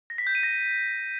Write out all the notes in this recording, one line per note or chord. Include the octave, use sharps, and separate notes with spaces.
A#6
B6
G6
D#7
A#6